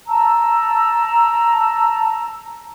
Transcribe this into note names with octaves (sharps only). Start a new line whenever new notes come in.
A5 A#5 E6